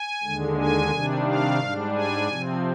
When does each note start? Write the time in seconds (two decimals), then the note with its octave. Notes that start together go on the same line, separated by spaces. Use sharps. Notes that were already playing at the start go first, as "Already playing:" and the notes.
Already playing: G#5
0.23 D#2 D3 G#3
0.58 G#5
0.91 C3 D#3 G3 D4
1.26 F5
1.60 G#2 G3 D4
1.94 G#5
2.28 C3 F3 C4